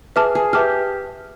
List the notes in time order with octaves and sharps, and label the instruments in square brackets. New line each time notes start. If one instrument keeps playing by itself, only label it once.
[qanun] G#4 [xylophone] B4 E5 A5 D6 F6
[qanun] G#4
[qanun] G4 [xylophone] B4 E5 A5 D6 F6